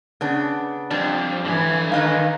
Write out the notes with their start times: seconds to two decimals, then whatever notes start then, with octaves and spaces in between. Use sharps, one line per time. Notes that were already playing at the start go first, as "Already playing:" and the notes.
0.21 C#3 B3 D4
0.91 F2 G3 D4
1.45 D3 E3 G#5
1.92 D#3 B4 D#5 F5